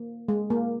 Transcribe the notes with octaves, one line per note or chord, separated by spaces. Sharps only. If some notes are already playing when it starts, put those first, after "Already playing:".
Already playing: A#3
G#3
A#3